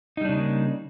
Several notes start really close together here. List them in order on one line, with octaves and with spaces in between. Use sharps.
D#4 G3 D4 C#3 A#3